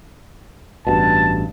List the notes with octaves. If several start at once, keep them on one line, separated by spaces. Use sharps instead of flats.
A1 G2 B2 A5